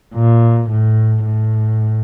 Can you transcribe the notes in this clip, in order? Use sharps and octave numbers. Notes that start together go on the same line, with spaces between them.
A#2
A2
A2